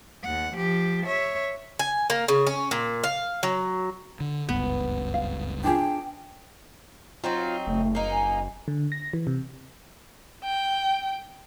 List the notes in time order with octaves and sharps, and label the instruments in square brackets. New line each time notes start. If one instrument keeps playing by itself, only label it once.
[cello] D#2 F#5
F3 G4
C#5 E5
[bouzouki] G#5
A#3
C#3
C#4
A#2
F5
F#3
[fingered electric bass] D3
[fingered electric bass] F#1 C#2 G2 [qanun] B3
[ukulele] F5
[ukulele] D4 F4 G#4 [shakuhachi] G5
[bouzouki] F#3 C4 D#4 [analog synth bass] F4
[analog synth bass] F#1 [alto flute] A3
[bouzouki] A#3 D#4
[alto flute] G#5
[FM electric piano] D3
A#6
E3
C3
[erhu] G5